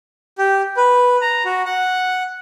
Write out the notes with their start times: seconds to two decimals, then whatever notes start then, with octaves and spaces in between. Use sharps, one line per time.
0.38 G4
0.77 B4
1.22 A#5
1.45 F#4
1.65 F#5